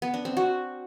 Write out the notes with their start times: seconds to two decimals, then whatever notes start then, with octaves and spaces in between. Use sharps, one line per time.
0.02 B3
0.14 D4
0.25 C4
0.37 F#4